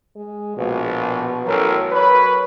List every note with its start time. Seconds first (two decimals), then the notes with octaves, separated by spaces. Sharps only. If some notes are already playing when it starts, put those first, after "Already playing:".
0.16 G#3
0.57 A#1 B2
1.47 A1 F#3 A4 A#4
1.92 B4 C#5 B5